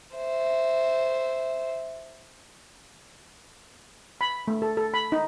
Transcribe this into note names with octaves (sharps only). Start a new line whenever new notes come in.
C5 E5
B5
A3
A4
A4
B5
D#4